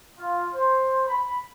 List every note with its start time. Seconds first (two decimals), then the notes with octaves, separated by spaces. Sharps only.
0.18 F4
0.53 C5
1.06 B5